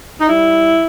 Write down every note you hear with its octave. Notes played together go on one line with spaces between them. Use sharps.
D#4
G3 E4